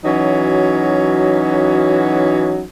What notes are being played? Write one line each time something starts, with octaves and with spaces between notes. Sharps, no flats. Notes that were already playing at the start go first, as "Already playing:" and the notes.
E3 F#3 C#4 D#4 F#4